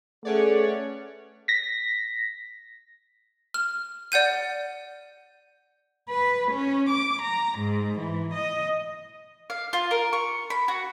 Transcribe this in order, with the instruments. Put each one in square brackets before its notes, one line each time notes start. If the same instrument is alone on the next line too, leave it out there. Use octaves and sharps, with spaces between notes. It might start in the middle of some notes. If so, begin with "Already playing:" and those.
[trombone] A3 [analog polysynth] C#4 C#5 D5 [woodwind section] G#4 B4 F#5
[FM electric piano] A#6 B6
[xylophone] F6
D5 F#5 G6 D#7
[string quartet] B4
C#4
D6
A#5
G#2
E3
D#5
[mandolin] F5
F4
A#4
C#6
B5
F#4